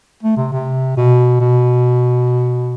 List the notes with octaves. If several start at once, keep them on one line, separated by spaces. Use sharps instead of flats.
A3
C3
C3
B2
B2